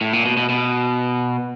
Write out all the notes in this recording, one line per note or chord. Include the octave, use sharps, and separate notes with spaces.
A2
A#2
B2
B2
B2